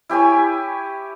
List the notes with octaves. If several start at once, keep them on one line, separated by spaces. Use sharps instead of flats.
E4 G4 C#5 G#5